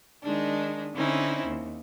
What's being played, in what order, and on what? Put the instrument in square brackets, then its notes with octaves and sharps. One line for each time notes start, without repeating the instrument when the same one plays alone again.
[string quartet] D#3 G#3 D4 D#4
D3 C4 C#4 D#4 E4
D#2